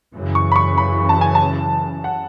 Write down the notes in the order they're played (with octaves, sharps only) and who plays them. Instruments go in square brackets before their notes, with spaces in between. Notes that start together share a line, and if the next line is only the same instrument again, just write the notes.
[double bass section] F#2 C#3 E3
[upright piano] C#6
B5
C#6
B5
A5
G#5
A5
F#5